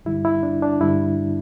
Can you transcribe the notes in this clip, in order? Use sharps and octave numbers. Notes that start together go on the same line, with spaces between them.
G2 D3 G3 E4
E4
D4
D4
G2 D3 G3 E4